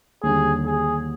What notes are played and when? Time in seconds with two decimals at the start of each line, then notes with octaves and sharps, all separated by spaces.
0.23 D#2 D3 G3 G#4
0.66 G#4